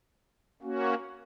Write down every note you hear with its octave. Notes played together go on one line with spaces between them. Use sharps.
A#3 C#4 F#4